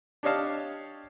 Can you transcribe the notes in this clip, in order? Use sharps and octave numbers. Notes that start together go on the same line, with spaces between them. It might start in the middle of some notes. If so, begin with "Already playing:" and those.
D4 G4 C#5 D#5 F5 A5